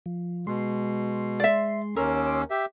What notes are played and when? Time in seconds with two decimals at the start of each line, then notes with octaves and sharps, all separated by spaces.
0.06 F3
0.47 B2 G#3 C6
1.40 D5 E5
1.96 D#2 C#4 A#4 C6 D6 E6
2.50 G4 E5